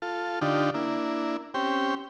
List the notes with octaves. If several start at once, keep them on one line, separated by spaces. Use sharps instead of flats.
F4 A4
D3 D4 D#4 F4 G4
A#3 D4 E4
C4 C#4 G4 G5